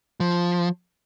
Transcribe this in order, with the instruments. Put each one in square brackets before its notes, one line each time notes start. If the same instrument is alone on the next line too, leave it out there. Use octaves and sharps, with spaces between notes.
[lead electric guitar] F3